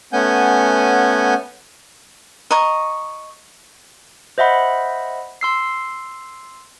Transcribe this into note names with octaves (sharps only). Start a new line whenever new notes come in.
A3 B3 C#4 F#5 G#5 G6
D#5 A#5 C#6
C5 D#5 E5 F#5 B5
C6 E6 C7